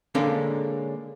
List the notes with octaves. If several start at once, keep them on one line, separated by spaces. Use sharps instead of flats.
D3 G#3 A#3 C#4 D4